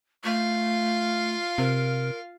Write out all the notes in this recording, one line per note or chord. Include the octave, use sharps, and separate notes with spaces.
A3 F4 F5
C3 A#4